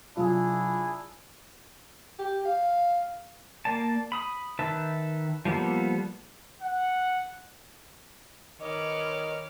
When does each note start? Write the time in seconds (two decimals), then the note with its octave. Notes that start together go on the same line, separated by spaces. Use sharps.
0.17 C3 F#3 D4 E4 F4 G#4
2.19 G4
2.45 F5
3.65 A#3 D5 A5
4.12 B5 D#6
4.59 D#3 B4 E5 A5
5.45 F3 G3 A#3 B3 A4
6.61 F#5
8.61 D#3 B4 C#5 D#5 D6 F6